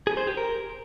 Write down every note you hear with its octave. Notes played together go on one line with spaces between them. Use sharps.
G#4
C5
G4
A#4